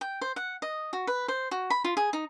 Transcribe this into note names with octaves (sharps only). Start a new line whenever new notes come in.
G5
C5
F#5
D#5
F#4
B4
C5
F#4
B5
F4
G#4
D#4